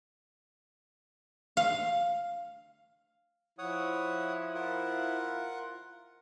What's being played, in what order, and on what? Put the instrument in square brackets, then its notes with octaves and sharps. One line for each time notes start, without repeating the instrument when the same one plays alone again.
[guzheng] F5
[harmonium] F3 E4 [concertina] C#5 F#5 D#6
[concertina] F4 A#4 F#5